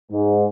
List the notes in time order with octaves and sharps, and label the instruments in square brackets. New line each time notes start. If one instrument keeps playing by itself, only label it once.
[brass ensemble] G#2